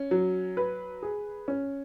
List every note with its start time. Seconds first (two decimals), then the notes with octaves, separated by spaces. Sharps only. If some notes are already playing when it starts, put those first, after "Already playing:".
Already playing: C#4
0.11 F#3
0.57 B4
1.03 G#4
1.48 C#4